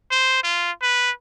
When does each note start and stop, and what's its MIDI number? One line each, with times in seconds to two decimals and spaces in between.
0.11 0.42 72
0.43 0.71 65
0.82 1.11 71